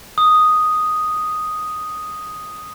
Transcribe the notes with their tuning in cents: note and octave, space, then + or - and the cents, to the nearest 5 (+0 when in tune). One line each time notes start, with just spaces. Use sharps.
D#6 +0